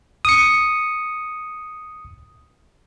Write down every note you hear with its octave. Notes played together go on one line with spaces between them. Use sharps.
D#6 C#7